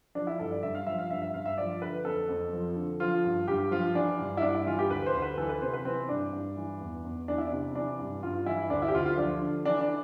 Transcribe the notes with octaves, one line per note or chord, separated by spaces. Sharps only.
F3 D4
E4
G2 A4
D5
G2 E5
F5
F3 E5
F5
G2 E5
E5
G2 F5
E5
F3 D5
D3 B4
F2 A4
F2
F3
D3
F3 F4
G2
G2 G4
F3 F4
E3 D4
G2
E4
G2 D4
E4
E3 F4
G4
D2 B4
C5
D2
B4
E3 A4
B4
C3 C5
B4
E3 C4
G2 D4
G2
E3
E2
E2
E3 D4
E4
C3 D4
E3 D4
G2
G2 F4
E3 E4
D2 D4
E4
G4
D2 F4
F4
F3 D4
D3
E3 D4
D4